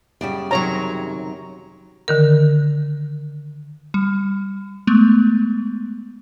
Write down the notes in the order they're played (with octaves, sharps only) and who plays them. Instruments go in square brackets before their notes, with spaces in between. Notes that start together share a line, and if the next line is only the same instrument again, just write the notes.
[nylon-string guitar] F#2 C#3 G3 [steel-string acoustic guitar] D5
[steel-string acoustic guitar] C3 D#3 F#3 [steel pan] C#5 A#5
[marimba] D3 D#3 A#4
[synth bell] G3
G#3 A3 B3